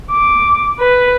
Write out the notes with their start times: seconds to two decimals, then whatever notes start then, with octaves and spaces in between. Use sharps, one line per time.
0.11 D6
0.80 B4